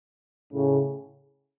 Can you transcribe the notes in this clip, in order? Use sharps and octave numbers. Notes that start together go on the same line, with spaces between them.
A2 C#3